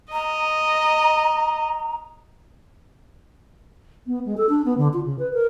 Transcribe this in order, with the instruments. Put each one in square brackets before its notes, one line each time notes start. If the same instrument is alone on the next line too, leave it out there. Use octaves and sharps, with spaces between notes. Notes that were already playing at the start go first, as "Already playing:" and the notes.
[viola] D#5 [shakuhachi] A#5
[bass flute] B3
G#3
A4
D4
B3
D3
F4
C#3
B4
A#4